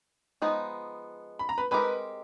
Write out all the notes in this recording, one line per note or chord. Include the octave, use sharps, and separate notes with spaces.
F3 G#3 B3 D#4
B5
A#5
B4 B5
G#3 C4 D#4 G4 A#4 B4 B5